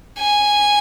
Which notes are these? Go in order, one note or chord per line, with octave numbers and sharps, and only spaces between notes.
G#5